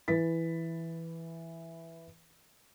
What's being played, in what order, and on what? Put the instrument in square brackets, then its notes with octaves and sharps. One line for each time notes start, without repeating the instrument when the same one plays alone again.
[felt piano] E3 B4 A6 B6